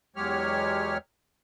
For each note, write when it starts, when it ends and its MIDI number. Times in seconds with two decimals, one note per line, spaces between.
0.16 0.98 40
0.16 0.98 54
0.16 0.98 56
0.16 0.98 67
0.16 0.98 73
0.16 0.98 89